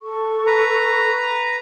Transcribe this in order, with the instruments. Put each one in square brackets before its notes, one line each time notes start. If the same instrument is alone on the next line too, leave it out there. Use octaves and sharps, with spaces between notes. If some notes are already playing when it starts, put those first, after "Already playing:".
[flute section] A4 C#6
[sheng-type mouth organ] B4 A#5